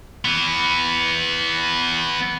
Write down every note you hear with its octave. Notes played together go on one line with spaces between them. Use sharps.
E3 B3